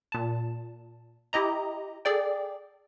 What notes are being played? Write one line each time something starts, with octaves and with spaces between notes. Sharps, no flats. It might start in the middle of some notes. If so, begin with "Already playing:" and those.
A#2 A5
E4 G4 D#5 A#5
G#4 A4 D5 G5